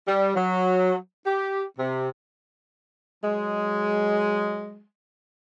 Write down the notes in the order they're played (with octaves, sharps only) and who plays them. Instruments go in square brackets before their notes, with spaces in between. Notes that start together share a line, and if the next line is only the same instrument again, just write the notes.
[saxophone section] G3
F#3
G4
C3
[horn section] F#3 G#3